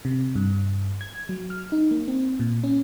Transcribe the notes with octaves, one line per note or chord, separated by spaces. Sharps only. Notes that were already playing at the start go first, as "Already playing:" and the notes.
C3
G2
G#6
F#3
F6
D#4
A#3
C4
A#2
C#4